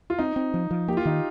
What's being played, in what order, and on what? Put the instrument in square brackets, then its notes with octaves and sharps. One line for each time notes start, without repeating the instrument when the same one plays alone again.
[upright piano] F4
[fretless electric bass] C4 [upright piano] D#4
[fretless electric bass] C4
F3
F3
[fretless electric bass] A#3 [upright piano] G4
[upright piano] F4
[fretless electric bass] D#3 [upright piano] D#4